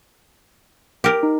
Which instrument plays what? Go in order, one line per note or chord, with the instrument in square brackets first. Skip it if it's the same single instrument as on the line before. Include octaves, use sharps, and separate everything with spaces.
[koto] G4 A#4
[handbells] D#4